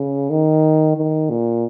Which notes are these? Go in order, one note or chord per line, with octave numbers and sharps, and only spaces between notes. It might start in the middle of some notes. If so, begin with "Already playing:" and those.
Already playing: C#3
D#3
D#3
A#2